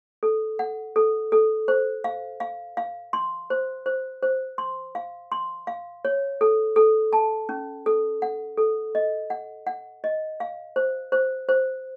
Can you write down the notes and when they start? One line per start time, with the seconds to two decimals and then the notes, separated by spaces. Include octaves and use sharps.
0.23 A4
0.59 F#5
0.96 A4
1.32 A4
1.68 C5
2.04 F5
2.40 F5
2.77 F5
3.13 C6
3.50 C5
3.86 C5
4.23 C5
4.58 C6
4.95 F5
5.32 C6
5.67 F5
6.05 C#5
6.41 A4
6.76 A4
7.13 A5
7.49 C#4
7.86 A4
8.22 F#5
8.58 A4
8.95 D#5
9.30 F#5
9.67 F#5
10.04 D#5
10.40 F5
10.76 C5
11.12 C5
11.49 C5